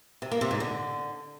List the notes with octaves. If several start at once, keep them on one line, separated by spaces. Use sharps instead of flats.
C3
A#3
C3
G#2
D3